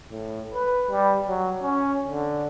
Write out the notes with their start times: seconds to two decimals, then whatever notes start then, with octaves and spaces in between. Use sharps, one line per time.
0.11 A2
0.54 B4
0.90 G3
1.28 F#3
1.63 C#4
2.07 D3